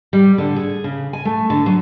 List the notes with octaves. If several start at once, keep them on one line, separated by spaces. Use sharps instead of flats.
G3
D3
G#4
C#3
G#5
A3
D3
F#3